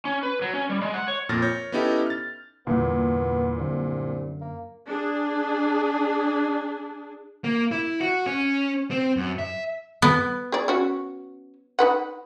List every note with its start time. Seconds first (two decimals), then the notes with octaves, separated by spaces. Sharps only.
0.05 C#4
0.23 B4
0.42 F#3
0.54 C#4
0.70 G3
0.81 G#3
0.94 F#5
1.08 C#5
1.29 F2 A#2 F6 A6 A#6
1.42 C#5 G6 A#6
1.72 B3 C#4 D#4 E4 G4 A4
2.06 F6 A6
2.67 E2 G2 A#2 D3 B3
3.58 C2 F#2 D3
4.41 A#3
4.87 D4 G#4
7.44 A#3
7.72 E4
8.00 F#4
8.26 C#4
8.91 C4
9.17 F#2
9.39 E5
10.02 B3
10.52 G#4 D5
10.68 C#4 F#4
11.79 D#4 B4 F#5